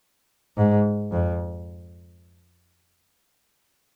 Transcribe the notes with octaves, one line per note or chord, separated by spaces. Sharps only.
G#2
F2